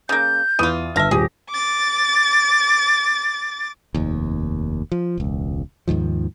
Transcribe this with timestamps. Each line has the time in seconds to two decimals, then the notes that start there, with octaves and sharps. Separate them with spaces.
0.09 C#3 A#3 G6
0.59 E2 E3 F4 D#6 D#7
0.96 G1 E5 F5 A5 F6 A#6
1.11 D#1 G4 G#4
1.50 D6 A6
3.94 F1 D#2
4.92 F3
5.17 E1 C#2
5.88 D#2 G#2 D#3 F3